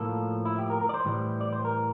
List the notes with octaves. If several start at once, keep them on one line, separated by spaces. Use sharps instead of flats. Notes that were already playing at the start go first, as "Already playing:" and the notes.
Already playing: A2 F3 A#3 A4
E4
G4
A#4
A#4
D5
C5
A2 E3 G3
D5
C5
A#4